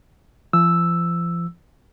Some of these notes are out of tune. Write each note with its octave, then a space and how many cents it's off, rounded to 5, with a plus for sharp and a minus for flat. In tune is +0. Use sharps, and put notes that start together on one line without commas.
F3 -40 E6 +0